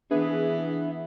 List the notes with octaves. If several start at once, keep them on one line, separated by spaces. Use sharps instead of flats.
E3 B3 D4 G#4 B4 E5